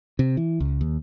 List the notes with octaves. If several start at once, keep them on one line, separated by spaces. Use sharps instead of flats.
C3
E3
C#2
D#2